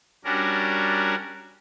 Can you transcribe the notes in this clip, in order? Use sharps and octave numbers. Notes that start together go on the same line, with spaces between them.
G3 C#4 D4 F#4 A#4